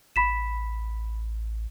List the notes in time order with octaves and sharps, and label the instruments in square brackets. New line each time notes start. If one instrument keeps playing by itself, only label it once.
[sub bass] A1 [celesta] B5 B6 E7